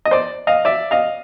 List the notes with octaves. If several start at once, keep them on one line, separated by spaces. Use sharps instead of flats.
D#5
C5 D5
D#5 F5
D5 E5
D#5 F5